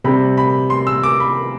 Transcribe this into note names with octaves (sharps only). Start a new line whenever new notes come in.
C3 G3 C4 B5
B5
C6
E6
D6
B5